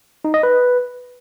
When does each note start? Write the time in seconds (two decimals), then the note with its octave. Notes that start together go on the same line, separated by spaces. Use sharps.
0.25 D#4
0.34 D#5
0.43 B4